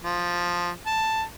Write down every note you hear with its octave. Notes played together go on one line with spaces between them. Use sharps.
F3
A5